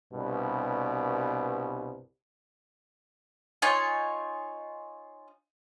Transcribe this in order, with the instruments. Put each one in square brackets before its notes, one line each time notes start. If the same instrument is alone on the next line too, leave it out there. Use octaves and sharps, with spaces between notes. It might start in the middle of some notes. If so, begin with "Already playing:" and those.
[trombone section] C2 G2 B2
[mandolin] D#4 F4 C#5 G#5